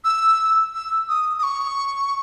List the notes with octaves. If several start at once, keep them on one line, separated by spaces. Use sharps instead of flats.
E6
E6
D#6
D#6
C#6